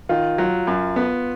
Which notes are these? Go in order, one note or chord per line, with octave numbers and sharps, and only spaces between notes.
D#3 F4
F#3 F4
F#2
B3